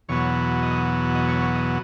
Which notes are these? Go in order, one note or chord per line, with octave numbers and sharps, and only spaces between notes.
E2 B2 F#3 B3 C#5
D#5
D#5
C#5
C#5
D#5